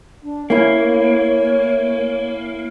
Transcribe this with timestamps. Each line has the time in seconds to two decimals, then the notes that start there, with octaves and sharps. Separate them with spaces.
0.23 D4
0.50 A#3 C#4 E4 C#5